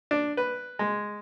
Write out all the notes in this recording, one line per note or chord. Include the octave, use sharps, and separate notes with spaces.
D4
B4
G#3